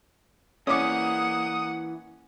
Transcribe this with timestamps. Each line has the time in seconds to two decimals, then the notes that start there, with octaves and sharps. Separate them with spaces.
0.67 E3 A#3 C#4 E4 D5 F#5 D6 D#6